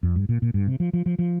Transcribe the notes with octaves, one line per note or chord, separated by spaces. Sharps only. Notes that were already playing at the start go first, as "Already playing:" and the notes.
F2
G2
A#2
A#2
G2
C3
F3
F3
F3
F3